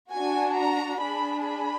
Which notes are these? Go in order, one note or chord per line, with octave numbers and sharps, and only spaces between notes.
D4 F#4 G#5
A#5
D4 G#4 B5
B5